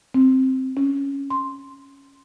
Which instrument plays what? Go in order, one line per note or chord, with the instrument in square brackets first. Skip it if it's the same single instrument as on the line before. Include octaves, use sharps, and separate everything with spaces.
[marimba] C4
C#4
C6